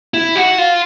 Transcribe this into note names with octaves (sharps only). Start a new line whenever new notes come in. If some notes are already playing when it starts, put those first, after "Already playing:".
E4
F#4
F4